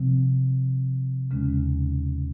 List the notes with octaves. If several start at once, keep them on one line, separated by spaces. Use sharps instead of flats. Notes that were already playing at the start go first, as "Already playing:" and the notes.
Already playing: C3 F3 C4
D#2 C#3 G#3 C#4